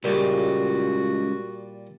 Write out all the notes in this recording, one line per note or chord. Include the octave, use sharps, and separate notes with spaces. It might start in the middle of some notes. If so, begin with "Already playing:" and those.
C#2 A#2 G3 A#3 F#4